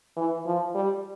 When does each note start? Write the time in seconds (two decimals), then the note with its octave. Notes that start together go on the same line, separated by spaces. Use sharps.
0.17 E3
0.46 F3
0.75 G3